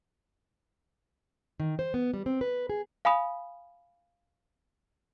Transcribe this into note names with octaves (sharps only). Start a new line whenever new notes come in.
D#3
C5
B3
G3
C4
B4
G#4
F5 G#5 B5 D#6